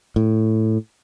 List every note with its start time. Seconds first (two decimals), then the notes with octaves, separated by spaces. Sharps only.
0.16 A2